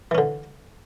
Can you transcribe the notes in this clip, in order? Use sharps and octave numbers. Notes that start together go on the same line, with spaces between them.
D3 E3 C#4